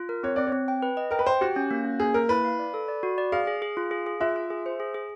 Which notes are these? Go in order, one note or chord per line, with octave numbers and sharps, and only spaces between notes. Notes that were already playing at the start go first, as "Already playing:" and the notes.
Already playing: F4
A#4
C4 C#5
C4 D5
C#5
C4
G5
B4
D#5
A#4 G5
B4
C5 G5
F#4 G4
C#4
A#3
C#4
A#3 G#4
A#3 A#4
E4 B4
F5
D5
A4
D5
F#4
D5
G#4 F5
G#4
G#4
F4
G#4
G#4
F4 E5
F4
G#4
C5
G#4
G#4